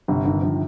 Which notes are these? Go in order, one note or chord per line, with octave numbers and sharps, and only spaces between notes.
G1 C3
G1 D#3
G1 F3